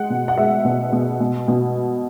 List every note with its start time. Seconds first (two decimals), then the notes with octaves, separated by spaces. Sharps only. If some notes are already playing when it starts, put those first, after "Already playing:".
Already playing: G#3 F#5
0.10 B2
0.28 F#5
0.37 G#3 E5
0.65 B2
0.92 B2
1.20 B2
1.48 B2